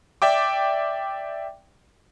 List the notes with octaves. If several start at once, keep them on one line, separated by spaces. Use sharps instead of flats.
D5 E5 G5 D6